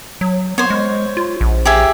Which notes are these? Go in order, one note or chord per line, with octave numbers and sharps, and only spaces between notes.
F#3
B3 C5 C#5
G#3
F4
A#1
G4 G#4 E5